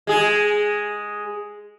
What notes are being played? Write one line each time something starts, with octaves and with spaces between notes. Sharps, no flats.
G#3 G#4